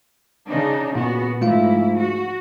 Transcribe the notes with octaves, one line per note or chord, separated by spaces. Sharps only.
C#3 D4 D#4
A#2 B3 F#4
G#2 F3 A3 E4 F4 F5
F#4